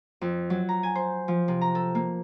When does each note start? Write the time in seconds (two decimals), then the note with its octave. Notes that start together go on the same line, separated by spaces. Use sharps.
0.21 F2
0.50 F#3
0.69 A#5
0.83 G#5
0.95 C5
1.28 F3
1.48 C3
1.61 A#5
1.75 A4
1.95 A#3